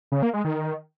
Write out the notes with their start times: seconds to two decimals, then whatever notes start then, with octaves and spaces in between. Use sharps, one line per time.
0.12 C#3
0.23 A#3
0.33 G#3
0.44 D#3